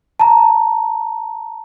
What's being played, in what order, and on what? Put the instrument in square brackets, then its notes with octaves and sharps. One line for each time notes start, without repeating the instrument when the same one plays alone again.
[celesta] A5 A#5